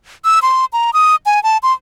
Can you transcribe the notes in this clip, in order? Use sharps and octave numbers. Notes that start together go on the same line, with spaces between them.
E6
C6
A#5
D#6
G#5
A5
C6